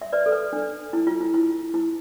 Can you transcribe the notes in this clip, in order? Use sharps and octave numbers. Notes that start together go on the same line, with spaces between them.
E5
B4 D5
A4
B4
D4
E4
F4
E4
E4
E4